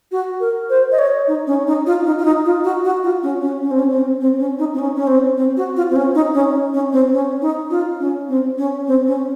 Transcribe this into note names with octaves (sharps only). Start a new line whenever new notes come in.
F#4
A#4
C5
D#5
C#5
D#4
C#4
D#4
F4
D#4
F4
D#4
F4
F#4
F#4
F4
C#4
C#4
C#4
C4
C#4
C4
C4
C#4
D#4
C4
C#4
C#4
C4
C4
F#4
F4
C4
C#4
D#4
C#4
C#4
C4
C#4
D#4
F4
C#4
C4
C#4
C4
C#4